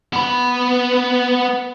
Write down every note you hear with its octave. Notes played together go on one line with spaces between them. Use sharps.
B3 B4